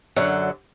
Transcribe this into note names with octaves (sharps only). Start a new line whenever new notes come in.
F#2 D3 F#3